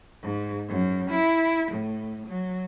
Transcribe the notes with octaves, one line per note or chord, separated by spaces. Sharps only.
G#2
F#2
E4
A2
F#3